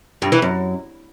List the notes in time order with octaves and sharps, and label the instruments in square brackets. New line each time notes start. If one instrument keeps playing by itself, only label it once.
[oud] G2
E3
F#2